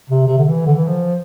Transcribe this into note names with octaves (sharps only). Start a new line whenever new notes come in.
C3
C3
D3
E3
D3
E3
F3